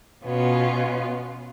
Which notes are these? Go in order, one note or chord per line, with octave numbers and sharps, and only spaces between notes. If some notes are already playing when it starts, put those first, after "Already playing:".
B2 B3 C#4 F4